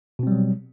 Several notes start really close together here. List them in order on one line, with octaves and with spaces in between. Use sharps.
B2 C4 G3 F#3